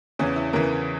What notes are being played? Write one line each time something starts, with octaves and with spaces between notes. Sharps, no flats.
E2 C#3 E3 C#4
E4
E2 C#3 E3 A#4